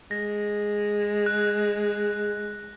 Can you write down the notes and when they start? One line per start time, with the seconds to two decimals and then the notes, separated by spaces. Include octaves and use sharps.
0.11 G#3 A#6
1.26 F#6